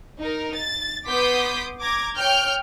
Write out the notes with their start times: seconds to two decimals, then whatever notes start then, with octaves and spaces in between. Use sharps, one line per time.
0.20 D#4 A#4
0.55 A6
1.08 B3 C6 D6 D#6 G6 B6
1.81 A#5 D6 G#6
2.18 C#5 G5 F6 G6